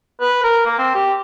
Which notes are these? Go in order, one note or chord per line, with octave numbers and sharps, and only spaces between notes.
B4
A#4
A#3
C4
G4